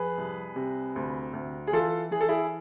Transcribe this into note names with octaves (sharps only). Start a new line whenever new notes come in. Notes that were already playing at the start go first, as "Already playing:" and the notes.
Already playing: F2 G#4 B4
C2
C3
D2
D2
G#4
E3 F4 A4
E3 G#4
A4
E4 G#4